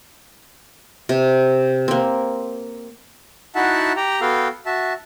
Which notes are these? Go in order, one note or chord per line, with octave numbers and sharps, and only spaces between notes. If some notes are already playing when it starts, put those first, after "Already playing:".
C3
A#3 C4
D#4 E4 F#4 E5 F#5 A5
G4 G5 A#5
B3 F#4 A4 F5 G5
F#4 E5 A5